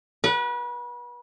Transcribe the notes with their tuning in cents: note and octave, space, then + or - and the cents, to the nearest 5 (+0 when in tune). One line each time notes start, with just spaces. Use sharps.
B4 -35 F#5 +0